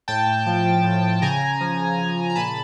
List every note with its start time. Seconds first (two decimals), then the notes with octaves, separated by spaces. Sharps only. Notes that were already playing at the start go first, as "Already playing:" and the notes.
0.08 A2 G5 A5
0.27 A2
0.46 F3
0.66 F3
0.84 A2
1.03 A2
1.22 C#3 G#5 A#5
1.41 C#3
1.61 F3
1.79 F3
1.98 C#3
2.18 C#3
2.30 A#5
2.35 A#2 A5 B5